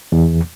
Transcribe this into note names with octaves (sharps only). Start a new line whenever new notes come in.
E2